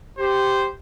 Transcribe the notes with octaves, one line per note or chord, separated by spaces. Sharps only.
G4 C5